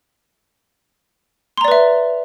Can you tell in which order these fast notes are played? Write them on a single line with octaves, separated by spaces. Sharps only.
C6 A#5 D5 B4 E5